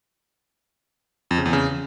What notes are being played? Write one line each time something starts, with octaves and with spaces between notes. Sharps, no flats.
F2
C#3
E2
C#3